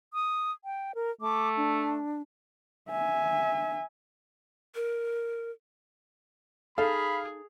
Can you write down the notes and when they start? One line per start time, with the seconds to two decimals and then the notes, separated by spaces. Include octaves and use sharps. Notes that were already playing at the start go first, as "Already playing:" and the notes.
0.14 D#6
0.65 G5
0.95 A#4
1.21 A3 D6
1.57 D4
2.90 E5 G#5
4.74 A#4
6.78 D#4 G#4 A4 F5 B5